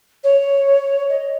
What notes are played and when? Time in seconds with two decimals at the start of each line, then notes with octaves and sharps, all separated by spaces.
0.23 C#5
1.09 D#5